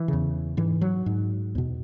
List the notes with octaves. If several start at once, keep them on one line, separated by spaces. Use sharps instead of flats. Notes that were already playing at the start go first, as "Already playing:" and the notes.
Already playing: E3
E2 C#3
G#2 E3
F#3
G#2
E2 B2